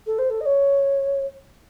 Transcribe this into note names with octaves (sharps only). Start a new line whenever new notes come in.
A4
C5
A4
D#5
C#5